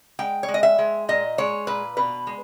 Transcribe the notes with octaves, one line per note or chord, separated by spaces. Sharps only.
G#3 G5
C#5
G#3
D#5
E5
G#3
A#2 D#5
G#3 C#5
A#2 B4
B2 B4
G#3